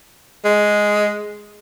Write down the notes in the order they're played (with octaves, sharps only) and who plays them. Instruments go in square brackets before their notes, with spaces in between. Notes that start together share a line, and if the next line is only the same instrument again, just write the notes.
[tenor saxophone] G#3